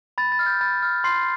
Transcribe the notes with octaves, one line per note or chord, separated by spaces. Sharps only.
B5 A6
A6
F6
G6
B5 A6
F6
C6 C7